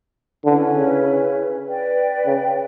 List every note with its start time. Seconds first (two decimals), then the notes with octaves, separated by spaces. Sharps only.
0.45 D3 C#4 E4 B4
0.75 C#3
1.66 B4 D5 G5
2.26 C#3